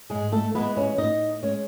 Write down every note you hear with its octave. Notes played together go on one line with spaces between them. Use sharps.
G#2 G#3 G#4
A3 A4
E3 G#3 B3 B4
C#4 C#5
A2 D#4 D#5
G#3 C#4 C#5